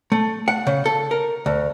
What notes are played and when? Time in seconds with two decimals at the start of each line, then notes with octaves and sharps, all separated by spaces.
0.12 A3
0.48 F#5
0.67 C#3
0.86 A4
1.11 A#4
1.46 D2